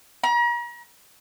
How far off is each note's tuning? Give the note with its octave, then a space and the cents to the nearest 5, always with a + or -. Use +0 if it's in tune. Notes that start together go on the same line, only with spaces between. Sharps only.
A#5 +40